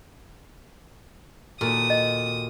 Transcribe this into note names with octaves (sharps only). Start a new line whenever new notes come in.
D#2 A#2 F#4 A4 D#6
D#5